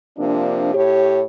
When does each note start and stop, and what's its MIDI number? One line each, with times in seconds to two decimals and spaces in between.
0.17 0.73 48
0.17 0.73 53
0.17 0.73 58
0.17 0.73 62
0.75 1.22 45
0.75 1.22 67
0.75 1.22 73